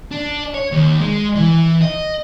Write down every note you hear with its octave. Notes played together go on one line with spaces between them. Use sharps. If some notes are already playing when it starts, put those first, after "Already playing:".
D4
C#5
D#2
G#3
E3
D#5